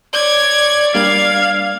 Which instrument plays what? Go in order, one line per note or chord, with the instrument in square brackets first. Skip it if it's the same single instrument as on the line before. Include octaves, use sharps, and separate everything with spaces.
[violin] C#5 G#6 [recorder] D5
[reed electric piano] G3 A#3 D4 [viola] F5 [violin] G#6